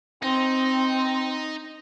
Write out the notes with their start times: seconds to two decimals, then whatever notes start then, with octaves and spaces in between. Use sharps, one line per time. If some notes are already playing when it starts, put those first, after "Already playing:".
0.23 C4 D#4